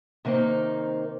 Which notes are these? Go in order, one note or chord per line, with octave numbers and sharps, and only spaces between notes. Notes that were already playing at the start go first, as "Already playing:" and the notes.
C3 D#3 A#3 C4 D#4